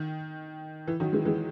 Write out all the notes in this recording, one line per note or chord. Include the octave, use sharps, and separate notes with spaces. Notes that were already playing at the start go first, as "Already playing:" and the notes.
Already playing: D#3
E3
D#3 F#3
E3 G#3
E3 G#3